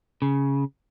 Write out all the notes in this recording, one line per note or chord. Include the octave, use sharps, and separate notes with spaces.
C#3